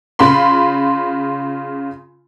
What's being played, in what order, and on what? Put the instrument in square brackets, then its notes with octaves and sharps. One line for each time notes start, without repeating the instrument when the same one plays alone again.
[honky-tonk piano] C#3 F4 B5 C6